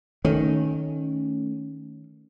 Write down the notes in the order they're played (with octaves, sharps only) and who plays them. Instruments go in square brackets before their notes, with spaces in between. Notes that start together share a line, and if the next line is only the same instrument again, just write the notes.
[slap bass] D#3 [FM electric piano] A3 C#4